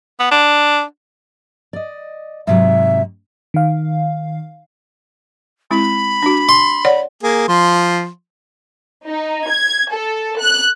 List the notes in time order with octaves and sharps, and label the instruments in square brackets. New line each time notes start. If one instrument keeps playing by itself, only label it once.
[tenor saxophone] B3
D4
[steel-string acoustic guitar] D5 D#5
[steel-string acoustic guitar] G#2 C3 F#3 [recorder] E5
[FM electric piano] D#3 F5
[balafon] G#3 C4 E4 [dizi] B5
[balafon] D4 F#4
[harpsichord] C6
[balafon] C#5 D5 F#5
[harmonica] A#3 G#4
F3 C6
[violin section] D#4
G#6
A4
F#6